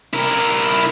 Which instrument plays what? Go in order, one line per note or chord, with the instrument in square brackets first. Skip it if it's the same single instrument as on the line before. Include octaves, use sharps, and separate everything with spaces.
[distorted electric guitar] E4 A#4